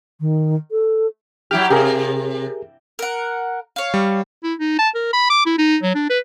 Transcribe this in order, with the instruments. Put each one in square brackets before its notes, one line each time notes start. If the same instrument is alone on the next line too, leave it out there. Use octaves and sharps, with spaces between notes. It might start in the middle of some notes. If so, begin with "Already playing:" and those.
[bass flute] D#3
A4
[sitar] F#3 E4 G4 [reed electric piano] G5 F6
[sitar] C3 [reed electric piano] G4 G#4 A#4
[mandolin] A#4 F#5
C#5 F5
[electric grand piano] G3
[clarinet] E4
D#4
A5
A#4
B5
D6
E4
D#4
F#3
D4
B4